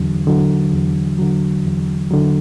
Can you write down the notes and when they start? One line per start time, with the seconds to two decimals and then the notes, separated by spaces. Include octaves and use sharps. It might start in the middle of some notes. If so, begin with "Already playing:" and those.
Already playing: E2 D3 F#3
0.27 D3 F#3
0.73 E2
1.18 D3 F#3
1.65 E2
2.10 D3 F#3